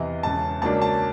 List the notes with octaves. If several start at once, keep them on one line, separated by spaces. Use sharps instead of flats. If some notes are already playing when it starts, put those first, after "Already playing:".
Already playing: E2 C3 E3 D#5
E1 E2 C#3 A5
C#2 C#3 F#3 A#3 D4 A5
A5